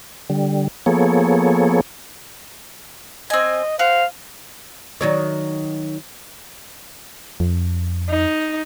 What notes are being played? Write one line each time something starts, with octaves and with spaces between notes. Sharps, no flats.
D3 G3
F3 A#3 B3 G#4 A4 C#5
C4 D#5 G#5
F#4 C5 F5
D#3 F#3 C#5
F2
D#4